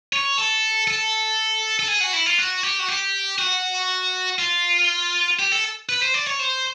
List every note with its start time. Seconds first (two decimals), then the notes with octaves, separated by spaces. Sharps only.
0.13 C#5
0.38 A4
0.87 A4
1.79 A4
1.88 G#4
2.01 F#4
2.13 E4
2.26 F4
2.38 F#4
2.63 G4
2.79 F#4
2.88 G4
3.39 F#4
4.39 F4
5.39 G4
5.52 A4
5.89 B4
6.02 C5
6.14 D5
6.27 C#5
6.39 C5